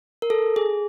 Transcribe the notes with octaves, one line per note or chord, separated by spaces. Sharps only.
A#4
A4
G#4